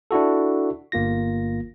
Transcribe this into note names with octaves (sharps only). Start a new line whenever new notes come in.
D4 E4 F#4 A4
G1 A#3 F4 A#6